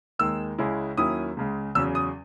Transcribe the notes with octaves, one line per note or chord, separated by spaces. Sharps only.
D#2 D#3 G#3 E6
C#2 C#3 G#3 C#4 E4
D#2 D#3 F#3 C#4 E4 D#6
C#2 C#3 G#3
E2 C#3 F#3 C#4 E6
D#6